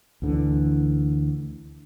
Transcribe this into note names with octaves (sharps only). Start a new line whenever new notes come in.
D2 D3 E3